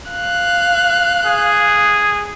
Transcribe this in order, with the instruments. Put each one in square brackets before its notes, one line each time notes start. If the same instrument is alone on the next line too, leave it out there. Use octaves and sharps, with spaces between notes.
[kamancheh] F5 F#6
[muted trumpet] G#4